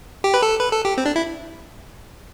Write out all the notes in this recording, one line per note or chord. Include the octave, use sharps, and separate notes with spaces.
G4
B4
A4
B4
A4
G4
C4
D4
E4